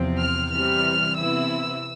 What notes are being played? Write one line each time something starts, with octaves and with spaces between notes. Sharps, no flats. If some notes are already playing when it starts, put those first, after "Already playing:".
Already playing: E2 C3 F3 C4
F6
C3 E3 G3 F6
C3 E3 B3 E4 E6